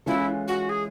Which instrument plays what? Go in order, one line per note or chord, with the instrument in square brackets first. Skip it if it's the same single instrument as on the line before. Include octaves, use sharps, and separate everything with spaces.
[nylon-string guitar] E3 G#3 C#4 F4 A4 [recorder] E4
[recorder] F#4
G#4